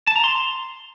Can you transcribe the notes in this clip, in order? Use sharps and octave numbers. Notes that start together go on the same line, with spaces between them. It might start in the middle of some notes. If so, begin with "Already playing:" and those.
A5
A#5
C6